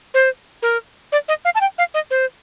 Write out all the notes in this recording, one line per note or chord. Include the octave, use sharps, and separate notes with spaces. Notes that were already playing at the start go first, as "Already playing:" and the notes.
C5
A#4
D5
D#5
F5
A5
G5
F5
D#5
C5